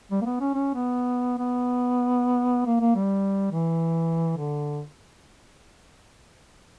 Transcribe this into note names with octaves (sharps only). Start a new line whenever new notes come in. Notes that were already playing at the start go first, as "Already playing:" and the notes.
G3
A#3
B3
C#4
C#4
B3
B3
A#3
A#3
G3
E3
D3